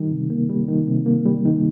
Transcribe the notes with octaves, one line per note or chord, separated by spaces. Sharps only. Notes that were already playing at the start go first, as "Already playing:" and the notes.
Already playing: D#3 G3
C3
A#3
G3
D#3
C3
A#3
G3
D#3